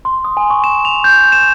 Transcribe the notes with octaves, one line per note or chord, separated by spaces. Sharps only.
C6
D#6
G#5
C#6
E7
F7
G6
E7